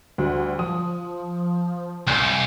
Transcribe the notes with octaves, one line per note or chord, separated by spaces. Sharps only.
D2 G3
F3 D#6
C2 G#5 G6